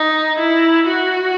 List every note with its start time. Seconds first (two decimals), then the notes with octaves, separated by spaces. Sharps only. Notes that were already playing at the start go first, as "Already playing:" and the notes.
Already playing: D#4
0.39 E4
0.87 F#4